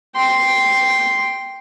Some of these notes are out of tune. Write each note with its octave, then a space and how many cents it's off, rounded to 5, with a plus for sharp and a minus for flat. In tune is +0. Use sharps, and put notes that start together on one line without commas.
G5 +0 C6 +0